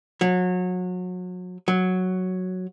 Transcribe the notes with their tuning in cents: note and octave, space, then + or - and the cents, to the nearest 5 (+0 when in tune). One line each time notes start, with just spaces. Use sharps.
F#3 -30
F#3 -5